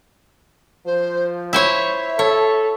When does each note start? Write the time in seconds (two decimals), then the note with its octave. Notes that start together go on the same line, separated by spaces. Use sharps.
0.86 F3 C5
1.53 E4 C5 C#5 E5
2.19 A4 C#5